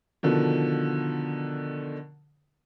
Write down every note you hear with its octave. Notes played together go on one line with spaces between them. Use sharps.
B2 D3 D#3 F3